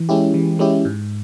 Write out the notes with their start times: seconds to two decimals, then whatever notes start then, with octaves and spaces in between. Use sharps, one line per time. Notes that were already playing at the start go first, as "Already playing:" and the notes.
Already playing: E3
0.09 G#3 C#4 E4 G4
0.34 E3
0.59 G#3 C#4 E4 G4
0.85 G#2